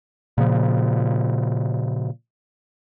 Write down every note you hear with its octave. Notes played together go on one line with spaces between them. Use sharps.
A#2 C#3 F3